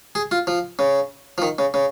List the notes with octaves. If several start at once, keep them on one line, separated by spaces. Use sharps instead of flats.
G#4
F4
F3
C#3
F3
D#3
C#3
C#3